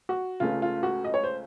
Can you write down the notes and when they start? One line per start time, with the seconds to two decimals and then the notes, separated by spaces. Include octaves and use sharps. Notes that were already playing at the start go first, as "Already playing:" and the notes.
0.09 F#4
0.40 C#2 C#3 A3 F4
0.62 F4
0.83 F#4
1.05 D#5
1.14 C#5
1.24 C5